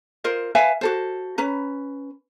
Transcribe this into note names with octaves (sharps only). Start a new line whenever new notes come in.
F4 A#4 C5 D#5
B4 E5 F5 G#5
F#4 A4 C5
C#4 B4 A#5